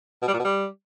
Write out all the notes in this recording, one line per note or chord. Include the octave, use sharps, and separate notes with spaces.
B2
G3
A#2
B2
G3